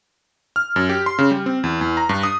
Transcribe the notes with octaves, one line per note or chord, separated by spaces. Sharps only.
F6
F#2
G4
C6
C#3
G3
C4
E2
E2
A#5
G2
D#6